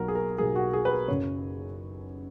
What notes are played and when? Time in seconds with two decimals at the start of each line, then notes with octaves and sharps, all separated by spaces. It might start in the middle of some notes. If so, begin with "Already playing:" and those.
Already playing: B1 B2 F#3 A#3 A#4
0.08 G#4
0.15 A#4
0.38 B1 B2 F#3 A#3 G#4
0.56 F#4
0.73 G#4
0.85 B4
0.91 A#4
1.08 F#1 F#2 C#3 C#5